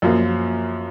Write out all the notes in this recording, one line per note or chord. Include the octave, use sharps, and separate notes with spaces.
F#2 F3 A#3